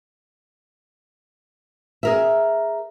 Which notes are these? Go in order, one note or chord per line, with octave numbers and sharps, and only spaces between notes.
G#4 A#4 E5